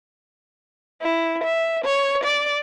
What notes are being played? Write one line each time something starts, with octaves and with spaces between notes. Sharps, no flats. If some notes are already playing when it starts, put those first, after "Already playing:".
E4
E5
C#5
D5